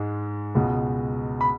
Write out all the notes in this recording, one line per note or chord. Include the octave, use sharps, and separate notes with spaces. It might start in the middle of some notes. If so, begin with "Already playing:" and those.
Already playing: G#2 G#3
C#2 B2 G#3
B5